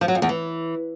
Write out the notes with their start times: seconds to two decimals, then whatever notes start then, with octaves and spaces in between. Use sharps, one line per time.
0.01 F3
0.08 F#3
0.15 F2
0.22 E2
0.29 E3